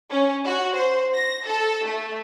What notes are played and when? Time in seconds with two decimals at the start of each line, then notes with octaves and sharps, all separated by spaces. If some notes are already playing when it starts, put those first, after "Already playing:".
0.10 C#4
0.45 F#4
0.75 C5
1.14 A#6
1.46 A4
1.86 A3